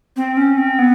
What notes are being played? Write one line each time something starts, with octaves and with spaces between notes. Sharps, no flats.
C4
C#4
C4
B3